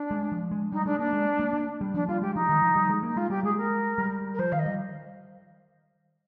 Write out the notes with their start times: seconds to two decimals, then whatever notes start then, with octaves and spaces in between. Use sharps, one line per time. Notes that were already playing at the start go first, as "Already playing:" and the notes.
Already playing: D4
0.11 G#3
0.32 F3
0.51 G#3
0.72 G3 D#4
0.86 G#3 D4
0.99 A#3 D4
1.13 G#3
1.39 A#3
1.53 A#3
1.81 G3
1.94 F3 D4
2.08 G3 F4
2.22 G#3 G4
2.35 F3 D#4
2.49 D#3
2.62 F3
2.76 G3
2.89 G#3
3.03 A#3 D#4
3.16 G#3 F4
3.30 G3 G4
3.43 G#3 G#4
3.57 A#4
3.98 G3
4.34 A#4
4.39 F3 C5
4.52 D#3 F5
4.59 D#5
4.66 G3